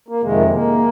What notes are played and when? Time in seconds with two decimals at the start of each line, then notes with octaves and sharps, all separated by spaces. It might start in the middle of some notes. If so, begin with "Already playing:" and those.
0.09 A#3
0.22 F2 C3 D#3 G#3
0.53 A#3